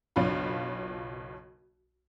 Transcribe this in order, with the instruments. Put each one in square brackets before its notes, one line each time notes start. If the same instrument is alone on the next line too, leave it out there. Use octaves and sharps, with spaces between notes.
[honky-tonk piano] F#1 B1 D4 F4 B5